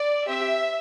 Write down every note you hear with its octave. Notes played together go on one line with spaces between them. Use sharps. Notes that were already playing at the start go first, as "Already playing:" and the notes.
Already playing: D5
C4 G4 E5